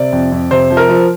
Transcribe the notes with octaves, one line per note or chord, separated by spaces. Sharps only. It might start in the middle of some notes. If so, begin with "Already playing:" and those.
Already playing: C3 D5
F2
F2
C3 C5
F3
A#4
F3